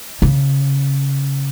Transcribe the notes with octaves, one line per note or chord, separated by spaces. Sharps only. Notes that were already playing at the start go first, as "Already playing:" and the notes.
C#3